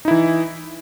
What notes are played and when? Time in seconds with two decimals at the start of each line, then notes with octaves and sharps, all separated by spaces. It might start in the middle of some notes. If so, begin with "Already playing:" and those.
0.05 D#4
0.08 E4
0.11 E3